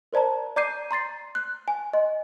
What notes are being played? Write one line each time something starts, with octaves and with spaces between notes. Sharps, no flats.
A#4 C5 D5 A5 A#5
D5 A#5 D6 G6 C7 D#7
A#5 C6 A6 C7
F#6
G#5
D#5 C6